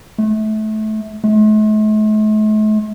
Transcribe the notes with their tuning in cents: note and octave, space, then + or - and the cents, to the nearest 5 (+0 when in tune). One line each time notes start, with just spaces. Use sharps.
A3 -25
A3 -45